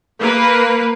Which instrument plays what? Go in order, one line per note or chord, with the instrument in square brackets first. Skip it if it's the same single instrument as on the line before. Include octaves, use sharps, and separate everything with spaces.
[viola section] A#3 B4